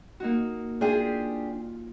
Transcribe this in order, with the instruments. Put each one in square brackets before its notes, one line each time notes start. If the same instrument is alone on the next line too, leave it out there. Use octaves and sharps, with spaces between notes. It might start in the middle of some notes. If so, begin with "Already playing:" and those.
[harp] A#3 D#4 F#4
[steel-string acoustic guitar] D4 G4 G#4 [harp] F4